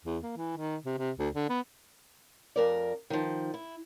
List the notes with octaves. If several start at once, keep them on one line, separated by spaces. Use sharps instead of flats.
E2
A#3
E3
D#3
C3
C3
D2
D3
B3
F2 A#4 D5
D#3 F3
E4